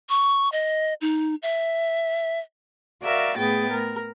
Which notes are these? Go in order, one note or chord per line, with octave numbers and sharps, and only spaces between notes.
C#6
D#5
D#4
E5
F#4 A#4 D5 E5 F5
A2 B3 G#4 G5 A6
A#4